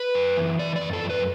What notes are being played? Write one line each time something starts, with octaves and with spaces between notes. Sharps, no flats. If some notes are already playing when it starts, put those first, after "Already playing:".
Already playing: B4
F#2
E3
E3 D5
D5
F#2
A4
F#2
B4